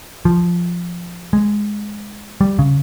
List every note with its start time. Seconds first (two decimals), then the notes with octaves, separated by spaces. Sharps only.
0.25 F3
1.33 G#3
2.41 G3
2.59 C#3